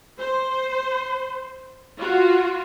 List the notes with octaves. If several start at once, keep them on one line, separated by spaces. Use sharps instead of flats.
C5
F4 F#4